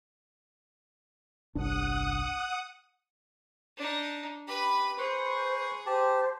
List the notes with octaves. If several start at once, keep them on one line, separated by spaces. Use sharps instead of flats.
G1 C2 D4 F#5 D#6
D4 D#4
G4 B4 B5
G#4 B4 C5 C6 C#6
G4 C5 A5